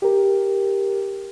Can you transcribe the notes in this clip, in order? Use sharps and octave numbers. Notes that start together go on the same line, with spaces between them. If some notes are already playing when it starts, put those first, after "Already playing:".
G4 A#4